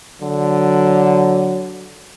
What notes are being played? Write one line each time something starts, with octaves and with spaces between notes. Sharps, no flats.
D3 F#3